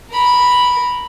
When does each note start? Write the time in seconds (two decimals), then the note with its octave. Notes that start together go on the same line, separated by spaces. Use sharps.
0.12 A#4 B5